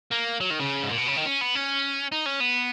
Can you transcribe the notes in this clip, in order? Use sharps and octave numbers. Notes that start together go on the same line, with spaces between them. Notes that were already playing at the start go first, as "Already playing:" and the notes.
A#3
F#3
D#3
C#3
G#2
A#2
B2
C#3
D#3
C#4
B3
C#4
D#4
C#4
B3